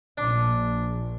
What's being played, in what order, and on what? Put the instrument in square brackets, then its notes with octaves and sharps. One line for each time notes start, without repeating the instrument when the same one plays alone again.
[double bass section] A#1 [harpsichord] D4